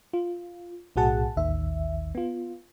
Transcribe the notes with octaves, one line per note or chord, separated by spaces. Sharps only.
F4
B1 A2 F#4 G#4 F#5 A5
A1 D#2 D#3 E5
B3 F4